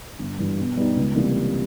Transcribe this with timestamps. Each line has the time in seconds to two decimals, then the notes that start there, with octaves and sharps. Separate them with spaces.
0.19 G1
0.39 G2 E3
0.58 B2
0.77 G3 B3 D#4 G4
0.97 C#2
1.16 C3 E3 G3 A#3